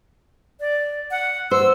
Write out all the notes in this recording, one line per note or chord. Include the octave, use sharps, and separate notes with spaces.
D5
F#5
C5 E6